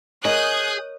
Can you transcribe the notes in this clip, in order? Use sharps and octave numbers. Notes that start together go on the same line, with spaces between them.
G#4 A#4 C#5 D#5 D#6 F#6 G6